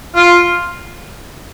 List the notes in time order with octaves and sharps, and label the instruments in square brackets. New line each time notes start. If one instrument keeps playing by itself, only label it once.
[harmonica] F4